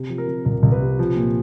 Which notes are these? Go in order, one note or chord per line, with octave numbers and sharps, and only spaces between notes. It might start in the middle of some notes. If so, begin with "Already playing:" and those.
Already playing: C3
F3
A#4
C3
C2 A#4
C2
B4
C3
F3
A#2